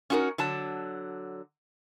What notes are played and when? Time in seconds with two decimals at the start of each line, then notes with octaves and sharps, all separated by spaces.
0.10 C#4 D#4 F#4 A4 A#4
0.38 D3 F#3 A5